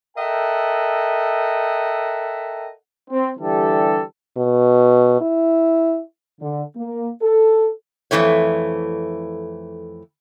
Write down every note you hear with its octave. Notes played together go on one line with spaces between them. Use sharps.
A4 A#4 D#5 E5 F#5 G5
C4
D3 E3 G3 G4 A4
B2
E4
D3
A#3
A4
F2 C#3 E3 A3 C#5